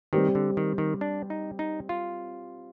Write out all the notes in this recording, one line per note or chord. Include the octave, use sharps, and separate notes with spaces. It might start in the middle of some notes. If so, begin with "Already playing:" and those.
D#3 G3 C4 G4
D3
D#3
D#3
D4
D#4
D#4
F4